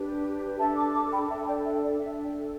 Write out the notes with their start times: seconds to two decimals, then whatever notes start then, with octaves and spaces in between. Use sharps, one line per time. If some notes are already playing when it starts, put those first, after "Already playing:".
Already playing: D4 G4 B4
0.58 D4 A4 E5 A5
0.76 A5 D6
0.94 A5 D6
1.12 G5 B5
1.29 D4 A4 E5 A5
1.46 D5 G5
1.64 E5
1.82 D5
1.98 D4 A4 E5
2.22 D5 G5